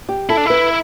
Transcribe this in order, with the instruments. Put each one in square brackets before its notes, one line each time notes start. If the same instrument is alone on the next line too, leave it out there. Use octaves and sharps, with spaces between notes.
[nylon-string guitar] G4
[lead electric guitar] E4 [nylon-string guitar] A4
[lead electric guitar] D4
[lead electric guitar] E4 [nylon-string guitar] B4